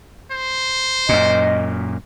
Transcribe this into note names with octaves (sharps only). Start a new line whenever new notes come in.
C5
F#2 A#2 D#5